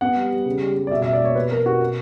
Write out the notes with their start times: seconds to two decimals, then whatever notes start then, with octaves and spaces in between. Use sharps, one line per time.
0.01 B3 F#5
0.16 G3
0.31 G3
0.45 C#3
0.62 G3
0.76 G3
0.87 D5
0.91 B2 E5
1.02 B2 E5
1.13 D5
1.20 A#3 C#5
1.35 B2 B4
1.51 B2 A#4
1.65 B2 F#4
1.80 B2